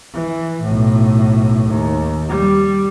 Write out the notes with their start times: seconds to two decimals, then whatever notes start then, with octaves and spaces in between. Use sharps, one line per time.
0.14 E3
0.63 B1 A2
1.68 D#2
2.29 G3